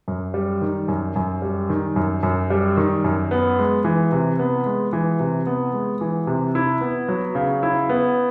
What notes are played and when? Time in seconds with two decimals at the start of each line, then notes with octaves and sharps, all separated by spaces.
0.08 F#2
0.34 G3
0.62 D#3
0.88 F#2
1.16 F#2
1.42 G3
1.69 D#3
1.96 F#2
2.23 F#2
2.50 G3
2.77 D#3
3.04 F#2
3.31 B3
3.59 G#3
3.84 E3
4.12 C3
4.39 B3
4.66 G#3
4.93 E3
5.20 C3
5.46 B3
5.73 G#3
6.01 E3
6.27 C3
6.55 E4
6.81 B3
7.08 F#3
7.35 C#3
7.63 E4
7.89 B3